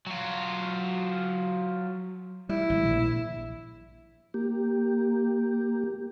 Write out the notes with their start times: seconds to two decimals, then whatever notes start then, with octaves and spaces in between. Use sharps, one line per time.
0.06 F#3 F4
2.49 G3 E4
2.70 G#1
2.85 A#1
4.34 A#3 G4